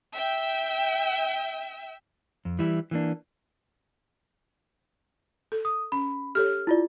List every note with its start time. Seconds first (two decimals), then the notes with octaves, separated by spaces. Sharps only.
0.13 E5 G5 E6
2.45 F2
2.59 E3 G3 E4
2.91 E3 A#3 D4
5.52 A4
5.65 D#6
5.92 C#4 B5
6.35 G4 A4 C#5 F6
6.67 E4 F4 D5